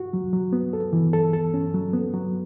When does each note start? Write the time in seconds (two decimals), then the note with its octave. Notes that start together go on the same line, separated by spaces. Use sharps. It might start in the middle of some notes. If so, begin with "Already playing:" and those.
Already playing: F#4
0.13 F#3
0.33 F#3
0.53 B3
0.73 A4
0.93 E3
1.13 A4
1.33 A4
1.54 C#4
1.74 F#3
1.93 B3
2.14 F#3